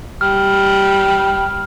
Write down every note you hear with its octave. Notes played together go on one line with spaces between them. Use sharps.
G3 F6